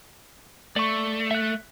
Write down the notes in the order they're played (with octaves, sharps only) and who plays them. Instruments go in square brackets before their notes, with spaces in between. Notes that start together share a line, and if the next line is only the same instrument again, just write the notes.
[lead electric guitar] A3 [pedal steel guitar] D5 C#6
[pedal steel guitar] E5 F#6